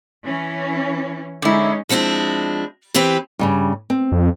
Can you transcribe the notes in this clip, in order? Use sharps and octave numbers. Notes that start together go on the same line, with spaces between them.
E3 C#4
D3 G#3 C#4 D#4 E4
F3 G#3 C4 D4 E4
E3 C4 G4 B4
G2 C#3 G3
C4
F2